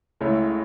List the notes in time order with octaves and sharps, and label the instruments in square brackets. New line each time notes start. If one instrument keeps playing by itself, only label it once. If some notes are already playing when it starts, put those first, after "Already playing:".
[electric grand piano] C#2 C#3 A3 E4 C#5